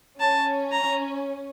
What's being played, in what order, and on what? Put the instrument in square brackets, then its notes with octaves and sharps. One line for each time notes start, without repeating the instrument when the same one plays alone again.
[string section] C#4 [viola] A5
[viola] A#5